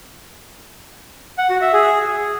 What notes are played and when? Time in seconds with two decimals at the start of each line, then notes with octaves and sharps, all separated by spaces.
1.38 F#5
1.50 F#4
1.61 E5
1.73 G#4